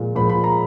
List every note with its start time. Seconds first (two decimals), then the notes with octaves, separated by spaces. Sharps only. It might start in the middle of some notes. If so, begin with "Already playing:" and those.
Already playing: A#2 F3 G#3
0.15 A#2 F3 G#3 B5
0.30 B5
0.44 A#5